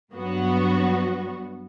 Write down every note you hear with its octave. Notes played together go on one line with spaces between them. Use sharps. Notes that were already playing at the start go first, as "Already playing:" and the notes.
G2 F#3 B3 F#4